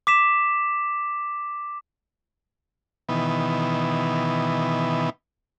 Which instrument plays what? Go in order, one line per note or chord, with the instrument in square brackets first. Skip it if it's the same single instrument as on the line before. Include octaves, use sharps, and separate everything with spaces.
[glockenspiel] D6 B6 E7
[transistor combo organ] B2 D#3 E3 B3